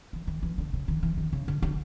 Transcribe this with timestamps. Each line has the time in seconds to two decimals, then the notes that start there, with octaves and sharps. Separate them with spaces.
0.13 E3
0.27 D#3
0.43 E3
0.58 D3
0.73 C#3
0.88 D#3
1.03 E3
1.17 D#3
1.33 C#3
1.48 D3
1.62 D3